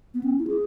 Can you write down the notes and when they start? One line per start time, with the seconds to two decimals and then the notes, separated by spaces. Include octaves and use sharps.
0.14 B3
0.23 C#4
0.39 E4
0.47 G#4